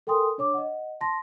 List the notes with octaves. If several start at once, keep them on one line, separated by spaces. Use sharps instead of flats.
A4 A#4 G5 G#5 C6 D#6
D4 C#5 D6
D#5 F#5
A5 C6 A#6